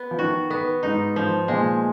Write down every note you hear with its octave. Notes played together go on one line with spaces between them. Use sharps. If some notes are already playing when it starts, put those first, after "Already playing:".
Already playing: B3
F3
D#3 F#4
B3
G#2 D#4
F3
A#2 G#3